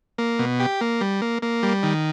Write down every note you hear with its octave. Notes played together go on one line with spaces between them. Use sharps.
A#3
B2
G4
A#3
G3
A#3
A#3
G3
D#3